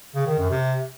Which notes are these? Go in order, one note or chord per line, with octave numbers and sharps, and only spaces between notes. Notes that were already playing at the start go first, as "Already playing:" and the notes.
C#3
D#3
F#2
C3